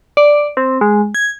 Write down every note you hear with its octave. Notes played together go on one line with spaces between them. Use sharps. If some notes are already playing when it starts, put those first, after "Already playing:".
D5
C4
G#3
G#6